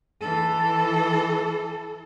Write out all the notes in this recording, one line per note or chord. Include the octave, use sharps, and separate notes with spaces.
E3 A4